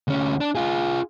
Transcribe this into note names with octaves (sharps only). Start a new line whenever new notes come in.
D2 C#4
D4
F4 G#4